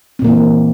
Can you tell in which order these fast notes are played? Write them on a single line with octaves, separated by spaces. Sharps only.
C4 A#2 A#3 E3